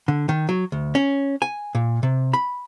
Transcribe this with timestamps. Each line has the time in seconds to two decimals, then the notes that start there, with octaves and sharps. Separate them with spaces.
0.08 D3
0.29 D#3
0.49 F#3
0.72 D2
0.95 C#4
1.42 G#5
1.75 A#2
2.03 C3
2.33 B5